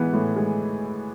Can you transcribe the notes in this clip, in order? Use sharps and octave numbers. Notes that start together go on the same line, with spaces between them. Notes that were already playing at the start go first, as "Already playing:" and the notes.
Already playing: E3 G#3 B3
A2
G#3